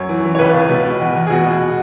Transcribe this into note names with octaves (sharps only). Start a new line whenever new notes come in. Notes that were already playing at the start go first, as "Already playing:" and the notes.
Already playing: F#2 C#5
E3
E3
C#5
C#2 B4
C#2
B2
B2
E2
E2
G#4
B2 F#4
B2